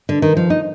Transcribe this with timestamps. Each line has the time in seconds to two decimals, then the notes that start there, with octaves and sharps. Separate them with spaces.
0.09 D3
0.22 D#3
0.37 F3
0.50 D#4